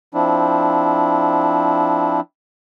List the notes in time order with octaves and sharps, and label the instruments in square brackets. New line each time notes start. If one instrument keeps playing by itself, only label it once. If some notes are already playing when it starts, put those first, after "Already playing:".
[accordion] F3 C4 D4 E4